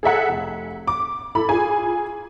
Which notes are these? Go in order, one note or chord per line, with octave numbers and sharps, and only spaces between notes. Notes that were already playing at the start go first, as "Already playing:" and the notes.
G#4 A4 E5 F#5
F1
D6
E4 A4 B5
F4 G#4 G#5